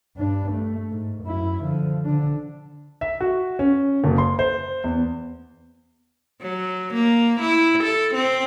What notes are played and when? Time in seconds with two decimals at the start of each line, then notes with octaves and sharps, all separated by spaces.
0.17 G2 D4
0.52 A3
0.90 G#2
1.23 F#2 E4
1.64 D3 F3
2.05 D3 D4
3.01 E5
3.21 F#4
3.59 C#4
4.04 F#1
4.18 C6
4.39 C5
4.84 E2
6.42 F#3
6.94 A#3
7.40 E4
7.84 A4
8.14 C4